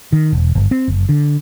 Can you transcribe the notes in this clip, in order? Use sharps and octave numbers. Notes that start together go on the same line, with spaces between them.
D#3
E1
G1
C4
F#1
D3